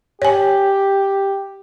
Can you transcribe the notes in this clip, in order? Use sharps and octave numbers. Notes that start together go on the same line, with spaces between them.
G4 C#5 G#5